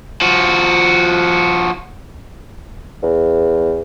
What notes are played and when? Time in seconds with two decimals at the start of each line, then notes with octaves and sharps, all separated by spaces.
0.21 F3 F#4
3.03 E2